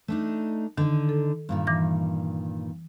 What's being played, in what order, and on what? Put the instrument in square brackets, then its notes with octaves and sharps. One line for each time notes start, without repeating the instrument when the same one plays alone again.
[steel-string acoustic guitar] A3 D4 D#4
[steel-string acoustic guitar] D3 D#4 [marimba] D#3
[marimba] A4
[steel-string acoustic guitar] G2 A#2 D#3
[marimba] E3 D6 A#6